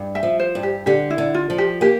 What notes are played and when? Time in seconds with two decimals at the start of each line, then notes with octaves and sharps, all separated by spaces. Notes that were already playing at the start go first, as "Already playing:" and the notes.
Already playing: G2
0.15 E5 G5
0.23 F3
0.39 C5
0.55 G2
0.63 G4
0.86 D3 G4
1.10 E4
1.18 D3
1.34 F4
1.50 F3
1.58 G4
1.81 A#3 G4